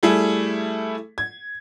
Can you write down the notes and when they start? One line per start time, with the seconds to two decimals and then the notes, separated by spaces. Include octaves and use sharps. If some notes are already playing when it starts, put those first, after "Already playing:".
0.03 G3 A3 E4 G#4
1.18 G#6